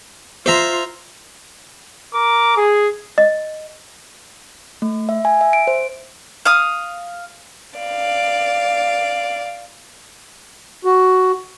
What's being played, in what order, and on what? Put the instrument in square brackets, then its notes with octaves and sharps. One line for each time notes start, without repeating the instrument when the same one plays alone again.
[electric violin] F4 [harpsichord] C5 E5 A#5
[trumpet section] A#4 D6
G#4
[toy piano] D#5
[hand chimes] A3
E5
G#5
E5
D7
C5
[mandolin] F5 D#6
[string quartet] D5 F5
[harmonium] F#4